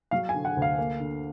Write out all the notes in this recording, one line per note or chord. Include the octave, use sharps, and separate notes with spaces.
F#3 F5
G#5
D3
F#5
D2
F5
A#3
D3